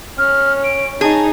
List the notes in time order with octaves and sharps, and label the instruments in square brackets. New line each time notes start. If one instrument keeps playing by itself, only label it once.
[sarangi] C#4 [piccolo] F6
[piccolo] D7
[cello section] D#4 [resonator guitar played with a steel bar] G#4 [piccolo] A5